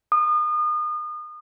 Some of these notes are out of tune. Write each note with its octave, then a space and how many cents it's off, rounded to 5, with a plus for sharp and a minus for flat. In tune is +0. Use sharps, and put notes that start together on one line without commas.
D#6 -35